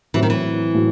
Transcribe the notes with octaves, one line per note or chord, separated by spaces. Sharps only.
A2 E3 F#3 C4 F#4
D#3
E3
A2 F#3